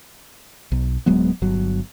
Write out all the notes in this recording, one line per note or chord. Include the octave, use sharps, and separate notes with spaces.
B1
D1 F#3 G#3 B3
G1 F#3